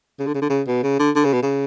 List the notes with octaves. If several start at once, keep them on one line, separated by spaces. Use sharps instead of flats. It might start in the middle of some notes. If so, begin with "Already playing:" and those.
C#3
D3
C#3
D3
C#3
B2
C#3
D3
D3
C#3
B2
C#3